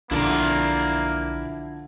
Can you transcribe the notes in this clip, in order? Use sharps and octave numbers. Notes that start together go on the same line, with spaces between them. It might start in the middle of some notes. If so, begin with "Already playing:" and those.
B1 D3 F3 A#3 E4 D5